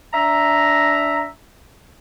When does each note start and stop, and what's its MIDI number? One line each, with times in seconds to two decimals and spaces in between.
0.14 1.26 62
0.14 1.26 76
0.14 1.26 82